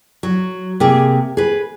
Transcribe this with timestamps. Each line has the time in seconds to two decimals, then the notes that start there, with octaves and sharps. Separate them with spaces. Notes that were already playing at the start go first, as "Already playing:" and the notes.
0.23 F#3
0.80 C3 A#3 G#4
1.37 G#4 B4